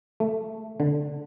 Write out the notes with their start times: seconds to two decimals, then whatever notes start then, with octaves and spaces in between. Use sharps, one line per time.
0.20 A3
0.80 D3